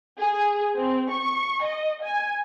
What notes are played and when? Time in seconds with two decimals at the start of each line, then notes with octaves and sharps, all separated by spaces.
0.19 G#4
0.76 C4
1.11 C#6
1.64 D#5
2.03 G#5